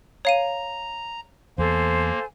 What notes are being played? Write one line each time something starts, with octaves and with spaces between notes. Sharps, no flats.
C#5 F5 A#5 D#7
E2 A#3 A4 C5 G#5